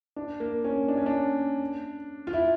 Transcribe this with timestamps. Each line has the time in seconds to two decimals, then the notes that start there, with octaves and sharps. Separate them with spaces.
0.16 D4
0.40 A#3
0.64 C#4
0.88 D4
0.97 C#4
1.06 D4
2.27 F4
2.33 E4